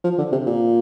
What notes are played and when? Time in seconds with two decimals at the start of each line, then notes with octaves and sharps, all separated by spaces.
0.04 F3
0.18 D3
0.32 C3
0.46 A#2